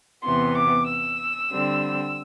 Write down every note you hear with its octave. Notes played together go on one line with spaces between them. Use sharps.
E2 C3 E3 B3 C6
D6
E6
D3 G3 C4